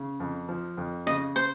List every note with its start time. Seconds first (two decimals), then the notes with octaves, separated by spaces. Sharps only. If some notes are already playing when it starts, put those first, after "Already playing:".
Already playing: C#3
0.20 F2
0.49 F3
0.77 F2
1.06 C#3 D#5
1.36 C5